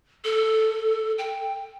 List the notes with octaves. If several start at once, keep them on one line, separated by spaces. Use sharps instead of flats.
A4
G5